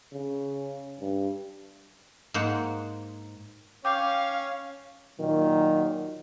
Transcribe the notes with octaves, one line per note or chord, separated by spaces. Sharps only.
C#3
G2
G#2 A#3 C5 F#5 G5
C#4 F5 G5 D6 G6
A#2 D#3 F#3